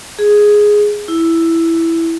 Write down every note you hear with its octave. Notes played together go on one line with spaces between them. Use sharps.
G#4
E4